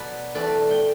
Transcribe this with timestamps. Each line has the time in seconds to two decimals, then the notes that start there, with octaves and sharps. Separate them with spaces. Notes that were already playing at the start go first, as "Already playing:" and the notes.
Already playing: B2 F#3 B3 B4 D5
0.35 E2 B2 A3 C4 B4 D5
0.71 G5